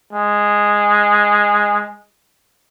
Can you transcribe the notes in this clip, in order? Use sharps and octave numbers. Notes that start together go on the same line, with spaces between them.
G#3